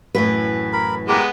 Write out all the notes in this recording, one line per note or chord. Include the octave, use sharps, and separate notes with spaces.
F#2 A2 E3 B4
A#4 B5
G#3 B3 G4 A#4 D6